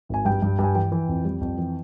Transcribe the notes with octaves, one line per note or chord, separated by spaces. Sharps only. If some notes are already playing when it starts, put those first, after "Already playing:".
G#1 G#5
G2 G5
G2
G2 G#5
E3 G5
E3
F2
G3
F2
E3